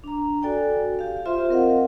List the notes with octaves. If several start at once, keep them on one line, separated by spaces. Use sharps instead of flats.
D4 A#5
F#4 A4 D5 G5 G#5
G4 F5
F4 G4 C5 E5 C6
C4 A#4 D#5 F5 F#5